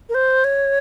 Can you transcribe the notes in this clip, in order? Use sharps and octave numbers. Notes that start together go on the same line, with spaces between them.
A#4
C5
C#5